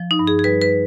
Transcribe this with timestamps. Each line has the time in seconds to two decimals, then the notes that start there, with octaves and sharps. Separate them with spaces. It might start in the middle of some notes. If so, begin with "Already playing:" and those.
Already playing: F3
0.11 D#4
0.19 G2
0.27 G#4
0.39 G#4
0.44 G3 B4
0.61 B4